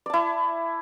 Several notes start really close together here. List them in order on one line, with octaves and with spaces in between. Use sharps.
D5 A5 E4